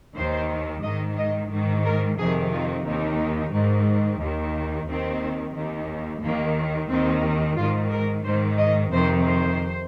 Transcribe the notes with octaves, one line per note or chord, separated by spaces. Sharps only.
D#2 D#3 C5
G#2 D#3 D#5
D#5
G#2 D#3
A#4
F2 C3 D#3 G#4
F4
D#2 D#3 D#4
G#2 D#3
D#2 D#3
D#2 D#3 C4
D#2 D#3
D#2 D#3 A#3
D#2 D#3 C4
G#2 D#3 F4
A#4
G#2 D#3 C5
D#5
F2 C3 D#3 C5
C5